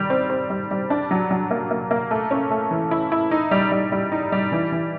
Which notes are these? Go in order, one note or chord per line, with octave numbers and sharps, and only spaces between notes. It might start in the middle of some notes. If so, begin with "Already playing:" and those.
Already playing: D#3 G3
C4
C4
G3
G3
D4
F#3
F#3
A#3
A#3
A#3
A3
C#4
A3
E3
E4
E4
D#4
G3
G3
G3
D#4
G3
E3
E3